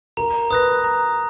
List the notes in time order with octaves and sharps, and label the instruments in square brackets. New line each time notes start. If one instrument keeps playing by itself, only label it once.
[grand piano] A#4 [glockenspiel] A#5
[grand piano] B4 [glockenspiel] D#6 F#6 A#6
[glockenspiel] A#5